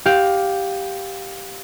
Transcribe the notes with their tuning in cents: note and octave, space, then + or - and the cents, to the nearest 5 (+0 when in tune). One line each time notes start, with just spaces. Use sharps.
G4 +0 F5 +15